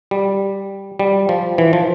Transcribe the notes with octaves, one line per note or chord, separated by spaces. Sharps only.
G3
G3
F3
E3
F3